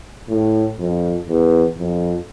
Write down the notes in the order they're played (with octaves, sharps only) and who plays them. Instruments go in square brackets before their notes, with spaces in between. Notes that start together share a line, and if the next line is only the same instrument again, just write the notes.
[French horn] A2
F2
E2
F2